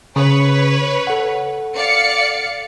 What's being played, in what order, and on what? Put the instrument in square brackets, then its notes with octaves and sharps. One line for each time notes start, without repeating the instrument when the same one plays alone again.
[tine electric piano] C#3 [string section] B4 C#5
[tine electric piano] A4 F#5
[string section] D5 F5 C#7